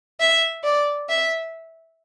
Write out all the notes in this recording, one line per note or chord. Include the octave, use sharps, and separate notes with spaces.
E5
D5
E5